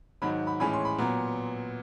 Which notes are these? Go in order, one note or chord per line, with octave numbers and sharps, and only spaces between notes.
G#2 D#3 F#3 B5
B5
A2 E3 G#3 C#4 B5
C6
B5
A#2 F#3 B3 A#5